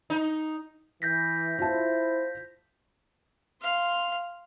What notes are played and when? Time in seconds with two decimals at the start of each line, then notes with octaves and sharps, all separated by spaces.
0.10 D#4
1.02 E3 G6 A#6 B6
1.59 E4 F4 C5 A5
3.62 F5 C6